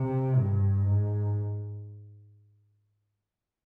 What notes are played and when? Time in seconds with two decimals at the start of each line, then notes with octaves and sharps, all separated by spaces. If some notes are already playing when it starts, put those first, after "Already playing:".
Already playing: C3
0.37 G2
0.86 G#2